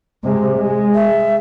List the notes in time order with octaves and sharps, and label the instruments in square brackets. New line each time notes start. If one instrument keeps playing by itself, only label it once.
[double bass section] C3 G#3
G#3
[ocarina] E5